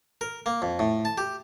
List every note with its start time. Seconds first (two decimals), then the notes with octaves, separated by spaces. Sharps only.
0.21 A#4
0.46 A#3
0.62 F2
0.79 A2
1.05 A5
1.18 G4